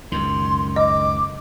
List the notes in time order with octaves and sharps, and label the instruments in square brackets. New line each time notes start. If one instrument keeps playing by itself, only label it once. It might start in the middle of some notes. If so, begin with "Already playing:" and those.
[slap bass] C#2 F#2 D#3 [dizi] C6
[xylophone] D#5 [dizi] D6